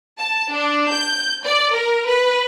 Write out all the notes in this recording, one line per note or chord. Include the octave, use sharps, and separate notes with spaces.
A5
D4
G6
D5
A#4
B4